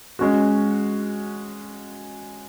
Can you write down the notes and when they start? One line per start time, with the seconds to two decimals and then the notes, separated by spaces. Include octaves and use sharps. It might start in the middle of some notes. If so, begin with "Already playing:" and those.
0.19 G#3 C#4 F#4